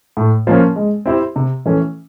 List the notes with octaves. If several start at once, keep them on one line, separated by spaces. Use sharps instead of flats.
A2
F3 A#3 C#4
G#3
C4 E4 G4 C5
C3
E3 A3 C#4